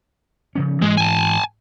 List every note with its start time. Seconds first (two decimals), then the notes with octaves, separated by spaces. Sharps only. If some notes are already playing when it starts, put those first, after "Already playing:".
0.55 C#3 F3 C#4
0.82 G#2 E3 G#3
0.97 G#5 A5